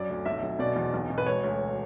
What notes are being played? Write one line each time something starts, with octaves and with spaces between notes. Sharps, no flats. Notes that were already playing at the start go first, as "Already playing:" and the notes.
Already playing: F#2 F#3 D5
D2
B1 E5
F#3
B2 D5
E2
B1
B2
B4
E1 C#5
D2